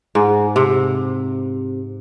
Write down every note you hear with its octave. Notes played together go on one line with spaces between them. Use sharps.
G#2
C3